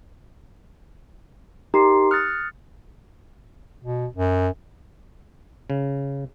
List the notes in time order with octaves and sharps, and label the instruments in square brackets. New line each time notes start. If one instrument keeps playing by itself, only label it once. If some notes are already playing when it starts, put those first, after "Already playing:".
[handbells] D#4 G4 A#4 [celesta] A#5 C6 C7
[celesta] D#6 F#6 C#7 [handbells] F6 A6
[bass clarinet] B2
F#2
[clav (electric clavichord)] C#3